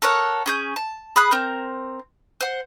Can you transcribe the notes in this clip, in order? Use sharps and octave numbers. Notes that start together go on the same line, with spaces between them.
A4 A#4 C#5 F#5
C#4 G#4 G6
A5
G#4 B5 D#6 F#6
C4 A#4 G6
C5 F#5